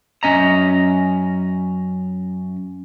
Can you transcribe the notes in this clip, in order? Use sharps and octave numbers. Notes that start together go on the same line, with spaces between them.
F#2 E3 C#4 D#5 A#5